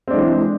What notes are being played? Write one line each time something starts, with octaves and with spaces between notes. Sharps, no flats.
E3 G#3 C4 D4